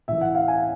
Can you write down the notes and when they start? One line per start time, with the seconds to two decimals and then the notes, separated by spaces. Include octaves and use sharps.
0.08 A2 E3 E5
0.21 F#5
0.35 F5
0.48 G#5